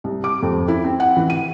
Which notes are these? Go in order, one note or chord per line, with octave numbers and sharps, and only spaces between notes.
C2
D6
F2
E4
C4
F#5
E3
D#7